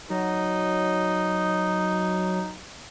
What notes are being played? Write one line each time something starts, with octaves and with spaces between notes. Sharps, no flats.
F#3 D#4